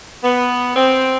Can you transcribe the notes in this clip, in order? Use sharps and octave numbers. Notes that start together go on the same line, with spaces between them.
B3
C4